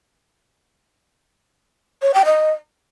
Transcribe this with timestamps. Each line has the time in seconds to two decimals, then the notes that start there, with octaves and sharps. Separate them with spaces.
2.02 C#5
2.14 G5
2.26 D#5